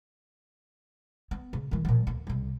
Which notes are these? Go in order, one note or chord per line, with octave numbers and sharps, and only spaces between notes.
B3
C#3
D#3 E3
A#2 F3
D2 A#3
C2 C3